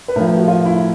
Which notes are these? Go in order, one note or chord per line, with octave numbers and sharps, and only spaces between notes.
B4
A2 F3 A#4
F#4
F4
E4